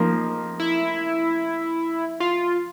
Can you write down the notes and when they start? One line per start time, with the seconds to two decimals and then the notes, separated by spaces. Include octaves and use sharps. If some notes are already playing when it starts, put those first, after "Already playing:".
Already playing: F3 A#3 D#4
0.60 E4
2.20 F4